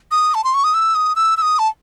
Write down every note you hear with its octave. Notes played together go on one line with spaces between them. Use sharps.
D#6
A5
C6
C#6
D#6
E6
D#6
E6
E6
D#6
A5